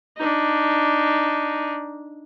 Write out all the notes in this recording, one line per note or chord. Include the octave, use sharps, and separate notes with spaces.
D4 D#4